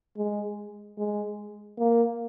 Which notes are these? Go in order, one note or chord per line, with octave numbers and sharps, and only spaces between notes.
G#3
G#3
A#3